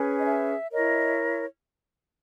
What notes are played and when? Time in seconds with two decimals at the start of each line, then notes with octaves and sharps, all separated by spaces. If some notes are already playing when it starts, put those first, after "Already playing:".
Already playing: C#4 G#4 B4
0.19 D#5
0.26 E5
0.72 E4 A#4 C#5 D#5